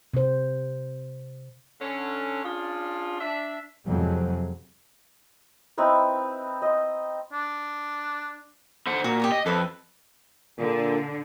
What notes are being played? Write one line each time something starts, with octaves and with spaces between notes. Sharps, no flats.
C3 C5
D3 C#4
C#3 D4 F4
D4 E5
F2 C3 F#3 G#3
C4 D#4 E4 B4
D#5 C6
D4
D3 C5 F#5
A#2 F#4
G4 C#5 D#6
D#5
F2 A4 B4 E5
A#2 D3